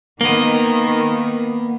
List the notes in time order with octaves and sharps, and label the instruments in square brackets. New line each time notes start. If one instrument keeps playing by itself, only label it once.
[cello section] D#3 [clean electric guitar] A#3 B3